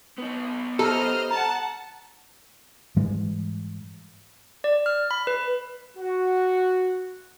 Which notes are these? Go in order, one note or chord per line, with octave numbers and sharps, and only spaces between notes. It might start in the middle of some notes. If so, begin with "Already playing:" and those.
B3 D#4
G4 A4 C5 D#5 E5 A#5 F6
F#5 A5 A#5
G#2 E3 G3 G#3
D5
F6
B5
B4
F#4